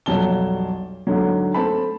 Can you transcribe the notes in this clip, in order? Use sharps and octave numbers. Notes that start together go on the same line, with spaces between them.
B1 F2 F#3 G3 A5 G7
G#2 D3 F#3
A3 C4 A5 B5